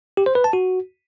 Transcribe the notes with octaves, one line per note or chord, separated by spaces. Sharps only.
G4
C5
B4
A5
F#4